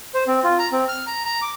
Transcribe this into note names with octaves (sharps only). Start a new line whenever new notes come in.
C5
C4
F4
A#5
C4
F6
A#5
A#5
D6